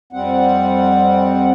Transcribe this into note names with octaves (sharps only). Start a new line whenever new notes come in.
F2 G3 C4 F#5